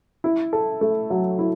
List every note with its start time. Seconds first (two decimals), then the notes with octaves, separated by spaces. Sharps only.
0.24 E4
0.53 A4
0.81 A3
1.10 F#3
1.39 E4